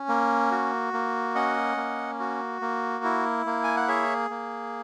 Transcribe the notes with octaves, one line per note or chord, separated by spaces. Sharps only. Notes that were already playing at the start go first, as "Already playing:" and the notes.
Already playing: C#4
A#3
F#4
A#3
C#4 D#5 F#5
A#3
F#4
A#3
E4
A#3
G#5
F#5
G#4 C#5 E5
A#3